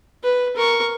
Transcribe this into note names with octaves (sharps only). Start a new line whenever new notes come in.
B4
A#4 C#6